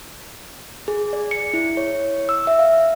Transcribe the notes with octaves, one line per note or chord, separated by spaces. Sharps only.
G#4
D5
C#7
E4
C#5
E6
E5
F5